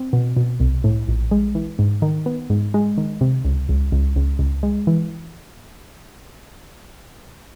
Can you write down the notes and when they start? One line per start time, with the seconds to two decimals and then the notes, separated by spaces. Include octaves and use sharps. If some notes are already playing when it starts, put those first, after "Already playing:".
Already playing: C4
0.13 B2
0.36 B2
0.60 C2
0.84 A2
1.08 A#1
1.31 G#3
1.55 E3
1.79 G#2
2.02 D#3
2.26 B3
2.50 G#2
2.74 G#3
2.98 D#3
3.21 C3
3.45 C#2
3.69 C#2
3.92 C#2
4.16 C#2
4.39 C#2
4.63 G#3
4.87 E3